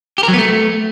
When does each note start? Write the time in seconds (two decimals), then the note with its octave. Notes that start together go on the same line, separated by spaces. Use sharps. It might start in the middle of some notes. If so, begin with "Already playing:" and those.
0.18 G4
0.23 A#4
0.28 F#3
0.33 B3
0.38 A3